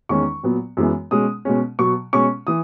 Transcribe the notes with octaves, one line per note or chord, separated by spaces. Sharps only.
E2 D#3 G#3 C#4 C#6
A#2 F#3 B3
F#2 E3 G#3 B3
B2 G#3 C#4 D#6
B2 G#3 C#4
B2 F#3 B3 C#6
B2 G#3 C#4 C#6
E3 D#6